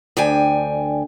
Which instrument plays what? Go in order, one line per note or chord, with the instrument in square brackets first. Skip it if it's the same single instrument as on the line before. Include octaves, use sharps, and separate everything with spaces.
[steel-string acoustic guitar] D2 D4 G5 G#5